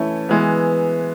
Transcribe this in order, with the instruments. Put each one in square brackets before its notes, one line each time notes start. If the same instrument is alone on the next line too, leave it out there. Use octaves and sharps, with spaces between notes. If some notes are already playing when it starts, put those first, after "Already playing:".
Already playing: [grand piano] E3 A3 C#4 E4
E3 G#3 B3